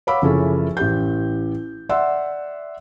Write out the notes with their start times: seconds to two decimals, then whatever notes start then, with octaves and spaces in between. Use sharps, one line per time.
0.07 C#5 F5 F#5 B5 D6 E6
0.22 F#1 C#3 F3 C#4 E4 A4
0.77 A1 G4 G6
1.89 D5 E5 F#5 C6 E6